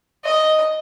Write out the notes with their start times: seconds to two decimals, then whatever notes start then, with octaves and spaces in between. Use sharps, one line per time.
0.24 D#5